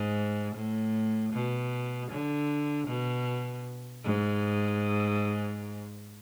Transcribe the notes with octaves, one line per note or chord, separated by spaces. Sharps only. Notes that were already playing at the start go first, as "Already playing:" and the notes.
Already playing: G#2
A2
B2
D3
B2
G#2